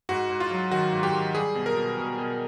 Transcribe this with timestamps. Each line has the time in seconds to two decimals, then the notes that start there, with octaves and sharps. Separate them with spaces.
0.09 G#2 F#4
0.30 G#2
0.40 F4
0.51 F#3
0.71 D#3 F#4
0.93 G#2
1.03 G4
1.13 D#3
1.35 G3 G#4
1.55 B2
1.66 A#4
1.76 B2
1.98 B2
2.18 B2